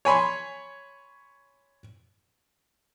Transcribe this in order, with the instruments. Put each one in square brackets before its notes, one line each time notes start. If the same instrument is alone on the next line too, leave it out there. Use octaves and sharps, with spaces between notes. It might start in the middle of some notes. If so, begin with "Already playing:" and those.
[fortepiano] C#5 G#5 B5 C6